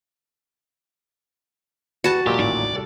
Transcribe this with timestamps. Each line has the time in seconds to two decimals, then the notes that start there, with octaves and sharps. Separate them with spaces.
2.04 E2 F#4 G4 B4 A5
2.26 E1 A#2 F#3 G4 D#5
2.39 A1 D#2 A2 D5
2.72 C2 G3 A4